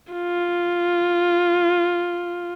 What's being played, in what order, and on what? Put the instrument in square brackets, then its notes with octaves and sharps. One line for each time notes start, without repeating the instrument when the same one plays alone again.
[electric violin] F4